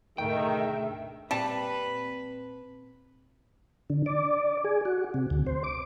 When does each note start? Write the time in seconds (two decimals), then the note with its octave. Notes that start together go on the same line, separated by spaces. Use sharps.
0.18 D2 G#2 B2 D#3 A3 E5 G5
1.31 A#2 G3 C4 B4 A5
3.90 D3
4.06 D5
4.64 G#4
4.85 F#4
5.14 C3
5.30 D2
5.47 C5
5.63 D6